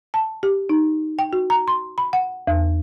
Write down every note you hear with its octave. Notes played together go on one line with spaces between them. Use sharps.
A5
G4
D#4
G5
F#4
A#5
C6
B5
F#5
E2